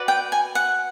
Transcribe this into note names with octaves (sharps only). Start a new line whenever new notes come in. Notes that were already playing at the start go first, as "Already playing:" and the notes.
Already playing: F#4 B4 D5
G5
G#5
F#5